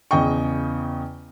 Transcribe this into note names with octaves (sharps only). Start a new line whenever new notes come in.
E2 C#3 D#5 G5 C#6